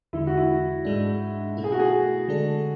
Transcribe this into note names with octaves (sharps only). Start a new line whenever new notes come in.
E2 D3 G#3 E4
F#4
E4
G#2 G#3 D4
B2 A3 E4
G#4
F#4
G#4
D3 G#3 D4 A4